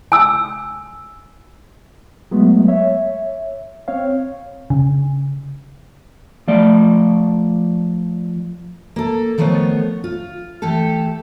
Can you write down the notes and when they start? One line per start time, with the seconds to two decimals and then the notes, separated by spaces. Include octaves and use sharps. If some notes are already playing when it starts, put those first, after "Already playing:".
0.12 G#5 E6
2.31 F#3 G#3 A3 B3
2.68 C#5 E5
3.88 C4 C#5 F5
4.70 C#3
6.48 F3 A3 D5
8.96 A#3 A4
9.38 D#3 F3 A3 B3 C#5
10.04 F4
10.62 E3 A3 G4 A4